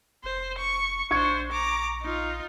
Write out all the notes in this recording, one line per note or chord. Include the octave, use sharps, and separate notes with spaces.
F1 C5
C#6
A#1 D4 C5 C#6 G#6 C#7
A#5 D6
D#4 F4